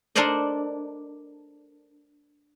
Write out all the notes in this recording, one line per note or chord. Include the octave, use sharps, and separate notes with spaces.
D4 A4 A#4 C5 D5 D#5